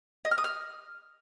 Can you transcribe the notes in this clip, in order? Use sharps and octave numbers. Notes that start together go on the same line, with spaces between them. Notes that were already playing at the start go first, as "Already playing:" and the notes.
D#5
F6
D#6
F6